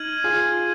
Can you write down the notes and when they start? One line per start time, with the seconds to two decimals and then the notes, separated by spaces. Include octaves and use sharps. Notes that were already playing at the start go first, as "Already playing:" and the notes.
Already playing: D#4 F6 G#6 D#7 F#7
0.24 F4 G#4